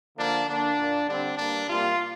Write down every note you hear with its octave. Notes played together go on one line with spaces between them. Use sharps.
D3 F3 A#3 D4
D3 A#3 D4
A#2 A#3
D3 G3 C4 D4
G2 G3 A#3 D4
C3 G3 A#3 F4